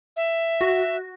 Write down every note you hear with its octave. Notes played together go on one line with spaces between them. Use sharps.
E5
F#4